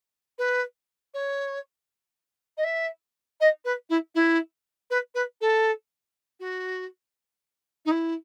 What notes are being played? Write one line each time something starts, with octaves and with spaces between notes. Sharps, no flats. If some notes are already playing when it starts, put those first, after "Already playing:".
B4
C#5
D#5
E5
D#5
B4
E4
E4
B4
B4
A4
F#4
D#4
E4